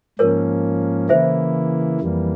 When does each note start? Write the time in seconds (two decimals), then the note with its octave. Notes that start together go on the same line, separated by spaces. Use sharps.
0.19 G#2 F3 A#3 C#4 A#4 C#5
1.09 C#3 E3 A#3 E4 C5 E5
2.00 F2 E3 G3 A#3